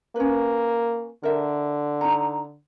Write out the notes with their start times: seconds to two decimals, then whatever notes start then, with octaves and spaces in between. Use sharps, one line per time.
0.16 A#3 C#4 B4
1.23 D3 A#4 E5
2.01 D#4 A#5